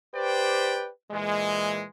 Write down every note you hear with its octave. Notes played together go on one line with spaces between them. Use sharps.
G4 B4 C5 D5 G5
A#2 E3 G#3